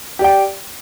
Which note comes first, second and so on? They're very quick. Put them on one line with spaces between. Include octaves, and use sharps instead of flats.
G4 D5 G5